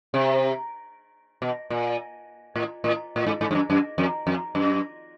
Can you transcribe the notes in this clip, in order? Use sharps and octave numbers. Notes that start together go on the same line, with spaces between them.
C3
B2
A#2
A2
A2
A2
G#2
G#2
G2
F#2
F#2
F2
F2
F#2